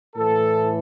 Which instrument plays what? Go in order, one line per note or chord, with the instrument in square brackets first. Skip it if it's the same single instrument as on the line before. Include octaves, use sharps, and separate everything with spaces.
[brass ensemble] A2 E3 A4